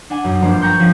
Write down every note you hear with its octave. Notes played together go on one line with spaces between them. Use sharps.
D4 F#5 G#5
B1 F#2
G1 F3 A#3 D4 C5 D7
G5 A#5 C#6 G6
F3 C#4